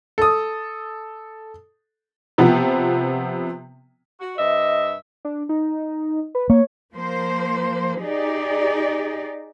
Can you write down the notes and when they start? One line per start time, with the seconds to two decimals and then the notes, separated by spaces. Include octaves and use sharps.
0.18 A4 D#6
2.38 C3 F3 B3
4.20 F#4
4.38 G2 C3 D#5 E5
5.25 D4
5.49 D#4
6.35 B4
6.50 A#3 C#5
6.92 F3 A#3 C5
8.00 D#4 G4 G#4 D5